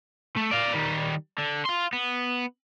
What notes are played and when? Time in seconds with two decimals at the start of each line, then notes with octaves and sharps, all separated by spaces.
0.37 A3
0.51 D5 F5
0.73 D#3 G3
1.38 D3
1.65 F5 C6
1.93 B3